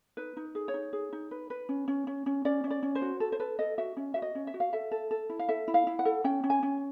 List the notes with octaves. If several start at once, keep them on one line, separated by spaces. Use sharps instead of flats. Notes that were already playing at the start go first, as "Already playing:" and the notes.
D#4 B4
D#4
G#4
C#5
D#4
G#4
D#4
B4
B4
C#4
C#4
C#4
C#4
C#4 D5
C#4
D5
C#4
C5
F#4
A4
C5
A4 B4
A4 D#5
F#4 E5
C#4
F#4 E5
D#5
C#4
E5
F#4
F5
A4 E5
A4
A4
E4
F5
A4 E5
E4
F5
E4
F#5
A4
C#4 G5
C#4
G#5
C#4